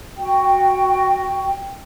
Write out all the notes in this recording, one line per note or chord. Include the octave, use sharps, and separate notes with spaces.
F#4 G5